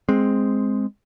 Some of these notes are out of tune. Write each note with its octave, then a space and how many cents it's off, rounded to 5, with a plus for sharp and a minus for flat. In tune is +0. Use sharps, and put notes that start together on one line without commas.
G#3 +0 C4 +0